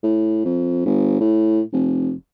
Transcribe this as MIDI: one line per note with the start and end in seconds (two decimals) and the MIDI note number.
0.03 0.44 45
0.45 0.85 41
0.86 1.20 31
1.21 1.61 45
1.73 2.14 29